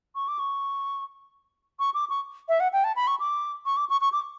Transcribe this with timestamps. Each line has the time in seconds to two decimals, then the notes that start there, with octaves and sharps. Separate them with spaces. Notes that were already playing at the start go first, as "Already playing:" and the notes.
0.15 C#6
0.28 D6
0.39 C#6
1.79 C#6
1.94 D6
2.10 C#6
2.49 E5
2.60 F#5
2.73 G5
2.84 A5
2.96 B5
3.07 C#6
3.20 D6
3.66 C#6
3.77 D6
3.90 C#6
4.01 C#6
4.12 D6